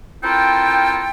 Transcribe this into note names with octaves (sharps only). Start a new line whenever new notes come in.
C4 E4 F4 A4 A#4 G5